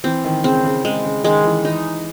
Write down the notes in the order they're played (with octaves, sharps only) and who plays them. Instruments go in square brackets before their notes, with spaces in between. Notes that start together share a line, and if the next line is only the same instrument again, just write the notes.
[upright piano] E3 [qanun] C4
[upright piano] D#3
[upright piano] C#3 [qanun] C4
[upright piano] C#3
[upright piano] C#3 [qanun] G#3
[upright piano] C#3
[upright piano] D#3 [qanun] G#3
[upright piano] E3
[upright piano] E3 [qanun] D#4